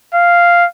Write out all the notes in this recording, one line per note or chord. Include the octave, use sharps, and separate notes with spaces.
F5